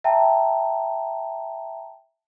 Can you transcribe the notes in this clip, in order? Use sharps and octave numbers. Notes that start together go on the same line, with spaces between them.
E5 G5 A5 A#5